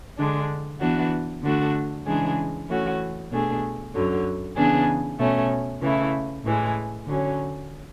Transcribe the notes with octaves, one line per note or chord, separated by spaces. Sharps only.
D3 G#3 D4
E3 B3 D4 F#4
D3 A3 D4 F#4
C#3 E3 G#3 D4 G#4
E3 A3 C#4 F#4
B2 A3 D4 G#4
F#2 D3 F#3
C#3 E3 B3 D4 G#4
B2 A3 C#4
C#3 E3 A3 E4
A2 E3 G#3
D3 F#3 C#4